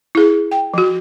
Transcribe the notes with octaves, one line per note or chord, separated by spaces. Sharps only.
E4 G#4
G5
F3 F#4